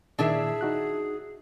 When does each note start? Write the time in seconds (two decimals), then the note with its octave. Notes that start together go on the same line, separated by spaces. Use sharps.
0.19 A#2 D#3 D4 E4 G#4 E5
0.61 D#4 F#4 F#6